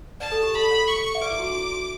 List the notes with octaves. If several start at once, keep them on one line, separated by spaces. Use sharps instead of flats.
B4 D5 A5
A4
G4
A4 B5
A4 C#5
C#6
E5
B4 D5 D6
E4
F#4
D4
F#4
E4
F#4